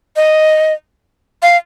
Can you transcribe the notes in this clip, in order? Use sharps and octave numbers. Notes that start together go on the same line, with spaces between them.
D#5
F5